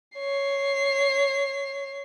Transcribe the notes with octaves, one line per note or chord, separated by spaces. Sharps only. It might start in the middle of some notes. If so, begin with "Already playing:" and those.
C#5 C7